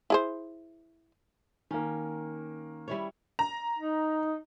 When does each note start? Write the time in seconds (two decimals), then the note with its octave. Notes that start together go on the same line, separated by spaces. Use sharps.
0.10 E4 G#4 C5
1.71 D#3 A#3 C#4
2.88 G3 E4 C#5
3.39 A#5
3.78 D#4